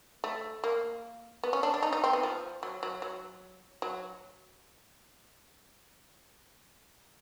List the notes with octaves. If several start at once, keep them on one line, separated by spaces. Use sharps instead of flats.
A3
A#3
B3
C#4
D4
D4
D#4
D#4
C4
B3
F3
F#3
F#3
F#3
F#3